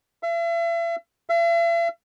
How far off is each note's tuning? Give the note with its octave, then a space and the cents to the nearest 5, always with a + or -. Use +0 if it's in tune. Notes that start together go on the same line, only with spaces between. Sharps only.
E5 +40
E5 +45